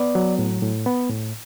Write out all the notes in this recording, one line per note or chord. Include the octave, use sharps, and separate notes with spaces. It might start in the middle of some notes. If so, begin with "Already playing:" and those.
Already playing: B3 D5
F#3
A2
A2
B3
A2